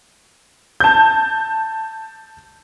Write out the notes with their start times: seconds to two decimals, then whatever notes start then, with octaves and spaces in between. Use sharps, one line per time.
0.80 A5 G6